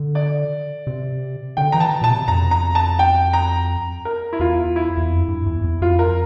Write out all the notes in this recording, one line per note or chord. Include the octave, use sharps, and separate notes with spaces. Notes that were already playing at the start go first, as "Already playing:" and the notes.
Already playing: D3
D5
C3
D3 G5
E3 A#5
A5
A#2 A5
C3
F2 A#5
A#5
A5
G5
A#5
A#4
E4
E2 F4
E4
E2
F2
G2
E2
E2
F2 F4
A#4